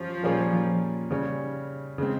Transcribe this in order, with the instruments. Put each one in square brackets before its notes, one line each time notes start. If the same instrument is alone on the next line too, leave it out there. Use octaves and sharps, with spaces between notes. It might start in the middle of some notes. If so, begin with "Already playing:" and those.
Already playing: [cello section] F3 [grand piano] C#4 G4
[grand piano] A#2 G3 A#3 C#4 G#4
C#3 G3 C#4
C#3 G#3 C4